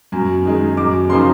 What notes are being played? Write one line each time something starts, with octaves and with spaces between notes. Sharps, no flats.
F#2
D#3 G#3
F#2 D6
C#3 F3 A#3 D#4 C6